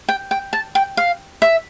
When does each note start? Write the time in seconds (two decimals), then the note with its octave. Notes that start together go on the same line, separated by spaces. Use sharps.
0.09 G5
0.31 G5
0.53 A5
0.75 G5
0.97 F5
1.42 E5